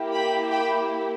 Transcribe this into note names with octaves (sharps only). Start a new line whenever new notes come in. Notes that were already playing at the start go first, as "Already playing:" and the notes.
Already playing: A#3 E4 G4
G5 B5
G5 B5